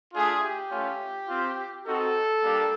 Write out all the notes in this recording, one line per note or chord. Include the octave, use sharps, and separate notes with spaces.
A3 D4 F4 G#4
G4
A3 C#4 F4
C4 F4
C4 D#4 F#4 A4
G3 A#3 D4 G4